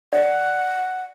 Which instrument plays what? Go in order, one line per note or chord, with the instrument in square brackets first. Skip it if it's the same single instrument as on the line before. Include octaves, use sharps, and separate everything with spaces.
[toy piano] D5 [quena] F#5